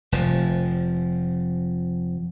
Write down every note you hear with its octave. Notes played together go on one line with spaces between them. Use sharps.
F1 F3